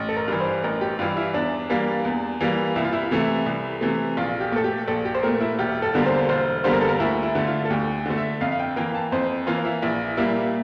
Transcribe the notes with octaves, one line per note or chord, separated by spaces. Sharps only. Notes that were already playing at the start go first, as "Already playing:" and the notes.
Already playing: A1
A4
A#4
G2 E3
C5
A1 A#4
G4
G2 E3 F4
E4
E2 D4
E3 G3 A#3
E2
E3 G3 A#3
C2 E4
F4
E4
C3 E3 A3
C2
C3 E3 A3
A#1 F4
G4
A#2 A3 A4
G4
A#1 A4
G4
C5
A#2 A3 A#4
E4
E1 G4
A4
E2 D3 G3 A#3
C5
E1 C5
E2 D3 G3 A#3 C5
A#4
A4
A#4
D2 E4
E4
D3 A3
F4
A4
D2 G4
D3 A3
E5
F2 F5
F5
G5
E3 A#3 G5
A5
F2 C5
E3 A#3 F4
E4
A#1 E4
A#2 G3 A#3 E4